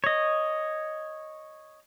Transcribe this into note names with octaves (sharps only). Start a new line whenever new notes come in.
C#5 D#5